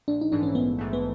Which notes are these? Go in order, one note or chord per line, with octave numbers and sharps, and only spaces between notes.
A#1 D4
D#4
G#2 E3 A3 D4
C#4
A#1 B3
G#2 E3 A3
B3